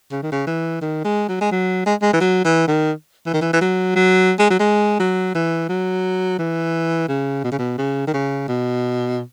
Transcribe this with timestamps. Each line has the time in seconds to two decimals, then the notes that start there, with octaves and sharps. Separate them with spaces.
0.12 C#3
0.23 D#3
0.32 C#3
0.47 E3
0.82 D#3
1.04 G#3
1.29 F#3
1.41 G#3
1.51 F#3
1.86 G#3
2.02 G#3
2.13 E3
2.21 F#3
2.45 E3
2.68 D#3
3.26 E3
3.34 D#3
3.41 E3
3.53 E3
3.61 F#3
3.96 F#3
4.39 G#3
4.50 F#3
4.60 G#3
5.00 F#3
5.35 E3
5.69 F#3
6.39 E3
7.08 C#3
7.44 B2
7.52 C#3
7.59 B2
7.78 C#3
8.07 D#3
8.14 C#3
8.48 B2